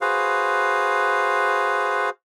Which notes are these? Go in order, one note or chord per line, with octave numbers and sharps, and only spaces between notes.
F#4 G#4 B4 C5 F5